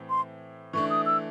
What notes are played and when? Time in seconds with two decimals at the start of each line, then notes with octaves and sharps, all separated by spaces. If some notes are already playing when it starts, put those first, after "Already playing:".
Already playing: A2 E3 C4
0.10 C6
0.73 E3 A3 D4 C#6
0.90 D#6
1.06 E6